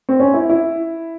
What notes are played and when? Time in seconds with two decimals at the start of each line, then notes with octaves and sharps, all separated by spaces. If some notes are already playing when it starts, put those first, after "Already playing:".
0.09 C4
0.20 C#4
0.34 E4
0.49 E4